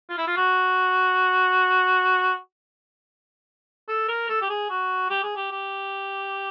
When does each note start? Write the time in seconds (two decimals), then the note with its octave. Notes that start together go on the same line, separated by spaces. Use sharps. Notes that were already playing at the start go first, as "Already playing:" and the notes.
0.09 F4
0.18 E4
0.27 F4
0.36 F#4
3.88 A4
4.08 A#4
4.29 A4
4.41 G4
4.49 G#4
4.70 F#4
5.10 G4
5.23 G#4
5.36 G4
5.51 G4